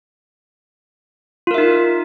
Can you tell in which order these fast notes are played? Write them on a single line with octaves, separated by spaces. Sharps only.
F4 A#4 E5 D#4